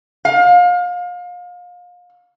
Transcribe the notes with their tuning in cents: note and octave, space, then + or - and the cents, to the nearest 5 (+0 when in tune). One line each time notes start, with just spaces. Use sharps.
F5 +30